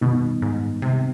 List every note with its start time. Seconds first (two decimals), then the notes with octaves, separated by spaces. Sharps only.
0.01 F#2 B2 D#3 G3 B3 D#4
0.42 G#2
0.82 C3